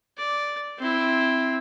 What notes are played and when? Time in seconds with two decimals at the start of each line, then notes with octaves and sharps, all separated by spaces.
0.17 D5
0.78 C4 E4